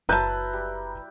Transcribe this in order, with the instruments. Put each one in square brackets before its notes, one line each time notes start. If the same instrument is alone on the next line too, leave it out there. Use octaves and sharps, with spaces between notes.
[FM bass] F#1 [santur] F#3 E4 [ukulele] B4 A5 [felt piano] A#5 F#6 G6
[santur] G3